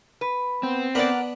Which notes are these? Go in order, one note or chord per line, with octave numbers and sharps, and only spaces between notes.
B4
B3 C4
B3 D4 A#4 D5 F#5 B5